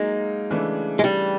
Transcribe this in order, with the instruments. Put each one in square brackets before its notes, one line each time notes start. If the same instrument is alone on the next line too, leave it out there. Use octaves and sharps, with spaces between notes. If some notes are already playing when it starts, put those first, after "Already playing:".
Already playing: [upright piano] F#3 A#3 D#4 [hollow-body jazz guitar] G#3
[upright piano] C#3 E3 A3 D4
[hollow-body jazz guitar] G#3
G3